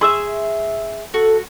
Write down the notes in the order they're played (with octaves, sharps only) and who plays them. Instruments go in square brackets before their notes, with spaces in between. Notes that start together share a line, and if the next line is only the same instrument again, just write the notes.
[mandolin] G#4 E5 [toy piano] C6 C#6 E6
[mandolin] F#4 [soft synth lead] A4